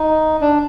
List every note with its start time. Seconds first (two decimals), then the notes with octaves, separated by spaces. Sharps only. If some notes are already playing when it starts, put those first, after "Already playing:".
Already playing: D#4
0.41 D4